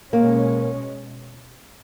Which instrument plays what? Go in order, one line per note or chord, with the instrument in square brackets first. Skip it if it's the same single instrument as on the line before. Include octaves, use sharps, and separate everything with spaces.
[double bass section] B2 G#3 C#4 [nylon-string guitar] A#3